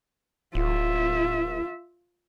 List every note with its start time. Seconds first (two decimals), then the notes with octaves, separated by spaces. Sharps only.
0.55 D1 F4 E5